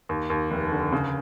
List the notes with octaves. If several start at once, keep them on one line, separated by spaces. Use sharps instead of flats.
D#2
D#2
F1
D3
C#3